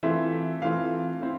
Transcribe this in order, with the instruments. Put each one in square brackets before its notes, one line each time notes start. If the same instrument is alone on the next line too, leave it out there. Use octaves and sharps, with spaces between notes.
[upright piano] E3 A3 C4 F4 E5
E3 A3 C4 F4 F5
C4 E4